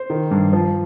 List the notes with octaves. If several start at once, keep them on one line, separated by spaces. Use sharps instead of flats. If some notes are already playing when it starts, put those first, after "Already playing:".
Already playing: C5
D#3
G2
F3